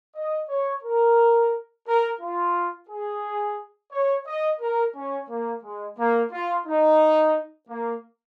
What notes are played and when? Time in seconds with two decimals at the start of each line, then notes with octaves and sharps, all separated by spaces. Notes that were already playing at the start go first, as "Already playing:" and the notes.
0.15 D#5
0.49 C#5
0.83 A#4
1.87 A#4
2.20 F4
2.89 G#4
3.92 C#5
4.26 D#5
4.60 A#4
4.95 C#4
5.29 A#3
5.63 G#3
5.98 A#3
6.32 F4
6.66 D#4
7.69 A#3